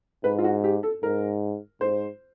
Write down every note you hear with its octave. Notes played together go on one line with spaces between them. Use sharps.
G#2 B4
F4
F#4
G4
A4
G#2 A#4
G#2 C5